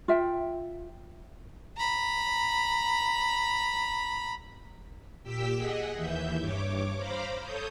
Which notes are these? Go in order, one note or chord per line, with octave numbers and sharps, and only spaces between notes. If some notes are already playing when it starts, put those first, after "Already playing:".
F4 E5 G5
A#5 B5
A#2 G4 G5 E6 B6
G#4 D#5 F#5
D#2 E3 E5 G6
G2 C#5 D6
C5 F5 A#5 B5 D6
A4 C#5 D#6 G6